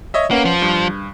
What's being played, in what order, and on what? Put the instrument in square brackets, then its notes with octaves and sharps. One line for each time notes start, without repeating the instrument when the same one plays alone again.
[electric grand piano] C#5 D#5 E5
[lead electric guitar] A#3 [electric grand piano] C#4 B4 F#5
[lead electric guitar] F3
[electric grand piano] G2